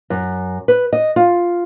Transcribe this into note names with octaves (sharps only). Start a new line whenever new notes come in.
F#2
B4
D#5
F4